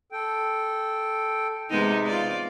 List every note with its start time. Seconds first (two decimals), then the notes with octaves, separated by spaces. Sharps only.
0.12 A4 G5
1.70 C3 G#3 B3 D#4
2.06 F4 D5